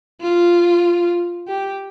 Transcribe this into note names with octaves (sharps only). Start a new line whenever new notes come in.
F4
G4